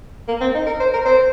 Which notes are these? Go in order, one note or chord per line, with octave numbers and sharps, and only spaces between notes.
A#3
C4
D#4
A#4
C5
A#4
C5